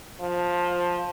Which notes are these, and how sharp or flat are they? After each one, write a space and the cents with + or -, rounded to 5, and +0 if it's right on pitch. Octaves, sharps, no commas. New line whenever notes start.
F3 +15